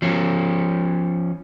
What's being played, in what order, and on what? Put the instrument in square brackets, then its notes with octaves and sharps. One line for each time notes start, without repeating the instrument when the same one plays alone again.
[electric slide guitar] F3 C#4